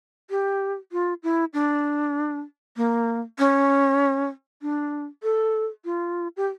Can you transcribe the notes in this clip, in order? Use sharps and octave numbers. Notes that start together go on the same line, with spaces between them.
G4
F4
E4
D4
A#3
C#4
D4
A4
F4
G4